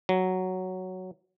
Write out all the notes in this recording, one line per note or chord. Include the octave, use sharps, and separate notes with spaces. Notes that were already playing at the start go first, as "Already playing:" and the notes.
F#3